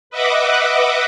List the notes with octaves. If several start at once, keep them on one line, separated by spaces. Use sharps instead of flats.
B4 D#5 E5 F#5 D6